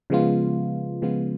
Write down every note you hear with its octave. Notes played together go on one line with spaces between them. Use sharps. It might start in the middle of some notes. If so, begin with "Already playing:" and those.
C#3 F3 G#3 B3 F4
C#3 F3 G#3 B3 F4